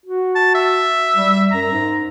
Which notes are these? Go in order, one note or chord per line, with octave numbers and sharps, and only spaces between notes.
F#4
A5
E5
G3
F#2 A#5
G#2